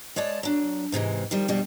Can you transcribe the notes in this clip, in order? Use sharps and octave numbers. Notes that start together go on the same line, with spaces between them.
G#3 C#5 D5 A5
F#3 D4
G#2 C3 E3 G#3
D#3 F3 G3
F2 B2 G3 D4